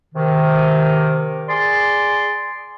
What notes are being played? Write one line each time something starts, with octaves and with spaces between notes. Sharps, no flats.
C3 D#3
G#4 D5 C6